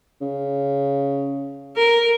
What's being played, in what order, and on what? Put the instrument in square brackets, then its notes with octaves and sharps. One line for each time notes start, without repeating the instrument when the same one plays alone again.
[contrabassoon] C#3
[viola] A#4